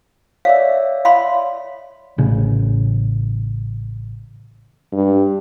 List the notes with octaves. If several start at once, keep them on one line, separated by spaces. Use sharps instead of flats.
C#5 D5 E5 F5
F5 B5 C6
A1 C#3
G2